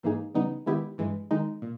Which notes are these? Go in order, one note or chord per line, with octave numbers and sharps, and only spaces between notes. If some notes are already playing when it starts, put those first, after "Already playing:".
G#2 E3 A#3 D#4 G#4
C#3 E3 G3 B3 D#4
D#3 G#3 B3 E4 G4
G2 E3 G#3
D#3 G#3 D#4
A#2